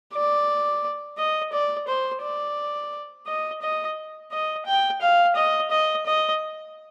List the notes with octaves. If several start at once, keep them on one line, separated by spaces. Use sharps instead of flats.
D5
D#5
D5
C5
D5
D#5
D#5
D#5
G5
F5
D#5
D#5
D#5